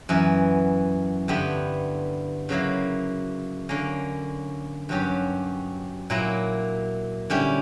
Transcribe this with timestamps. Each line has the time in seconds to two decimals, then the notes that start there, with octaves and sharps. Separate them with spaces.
0.09 F#2 E3 B3
1.28 G2 D3 G3 B3 E4
2.49 C#3 F#3 A#3 E4
3.69 D3 A#3 C#4
4.89 G2 F#3 C#4 G4
6.10 A#2 F#3 A#3 E4
7.30 D3 G3 C#4 E4 G4